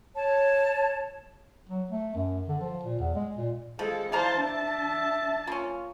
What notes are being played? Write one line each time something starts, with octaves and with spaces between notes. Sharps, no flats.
C#5 A5
F#3
A3
F#2
D3
F3
A#2
E2
G#3
A#2
F3 G#3 A4
E4 C5 D5 F5 A5 A#5
D4 E5 A5
A#3 C#4 F4